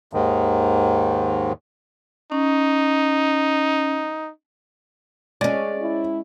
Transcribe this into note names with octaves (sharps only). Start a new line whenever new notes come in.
D#2 G#2 D#3
C#4 D#4
G#3 C#4 D5
E4